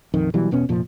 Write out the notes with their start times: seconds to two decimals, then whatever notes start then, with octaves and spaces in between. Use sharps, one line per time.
0.14 A#1 F2 D#3
0.34 B2 E3 F#3 G3
0.51 E1 B2 B3 C#4
0.69 F1 A#2 F3